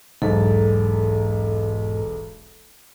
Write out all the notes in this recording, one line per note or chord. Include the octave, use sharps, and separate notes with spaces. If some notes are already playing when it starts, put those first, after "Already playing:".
E1 B1 G#2 A4